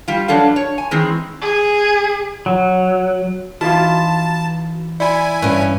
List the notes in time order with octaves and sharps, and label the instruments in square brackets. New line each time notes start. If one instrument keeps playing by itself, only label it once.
[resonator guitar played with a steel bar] G3 F4
G2 F#3 D4 A4 F5
C#5
G#5
D#3 E3 G#3 C4
[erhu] G#4
[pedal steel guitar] F#3
[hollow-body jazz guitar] E3 D#4 F4 [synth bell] F#4 [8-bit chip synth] A5
[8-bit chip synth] E4 G#5 [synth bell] D5 B5
[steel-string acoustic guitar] G2 C#4 [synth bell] D#7